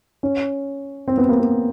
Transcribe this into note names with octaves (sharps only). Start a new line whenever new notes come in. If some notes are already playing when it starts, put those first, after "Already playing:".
C#4
C4
B3
A#3
B3